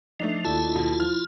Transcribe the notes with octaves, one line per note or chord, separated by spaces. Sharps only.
F3 A3 D4 D#4
D#2 E4 F4 A4 A5
B2
F3 F6